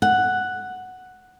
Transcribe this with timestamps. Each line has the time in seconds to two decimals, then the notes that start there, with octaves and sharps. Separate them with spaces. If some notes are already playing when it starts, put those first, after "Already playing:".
0.02 F#5